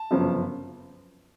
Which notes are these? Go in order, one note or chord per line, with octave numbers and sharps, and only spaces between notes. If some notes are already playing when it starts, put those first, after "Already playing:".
Already playing: A5
G1 F#2 C#3 F3